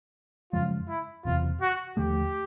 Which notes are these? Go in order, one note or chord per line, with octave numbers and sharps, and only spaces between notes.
F#2 C#3 F3 G#3 F4
E4
F#1 E2 C3 F4
F#4
D#2 D3 F3 A3 G4